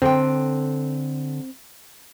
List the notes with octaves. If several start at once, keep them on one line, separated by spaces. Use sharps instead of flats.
D3 C4 G5